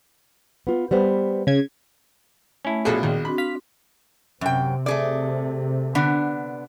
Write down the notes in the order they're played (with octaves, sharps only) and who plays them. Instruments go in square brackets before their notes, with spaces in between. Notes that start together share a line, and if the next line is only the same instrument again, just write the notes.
[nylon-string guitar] B3 F4
G3 B3 C5
[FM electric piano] C#3 G#6
[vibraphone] A3 A5 [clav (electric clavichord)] C#4 E4
[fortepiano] A#1 B2 B5 [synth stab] G#4 A4
[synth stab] A#2 D#3 [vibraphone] G#4
[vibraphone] C4 D4 F#4 [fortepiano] B5
[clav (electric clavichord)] F5 [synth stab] B6
[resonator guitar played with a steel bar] F#2 G5 [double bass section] C3
[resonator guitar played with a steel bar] A3 G#4 D5
D3 B3 D4